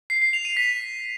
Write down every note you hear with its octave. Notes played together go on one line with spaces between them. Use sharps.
C7
C7
F7
D#7
B6